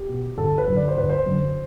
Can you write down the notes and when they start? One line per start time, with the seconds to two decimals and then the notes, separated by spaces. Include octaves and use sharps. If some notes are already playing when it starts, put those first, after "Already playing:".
Already playing: G4
0.08 B2
0.37 G1 A4
0.58 B4
0.67 F#2 D3
0.77 D5
0.88 C5
0.97 G1 B4
1.09 C5
1.26 F#2 D3